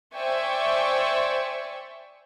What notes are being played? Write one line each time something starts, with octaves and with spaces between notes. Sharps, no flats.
C5 D5 E5 G5 G#5 C#6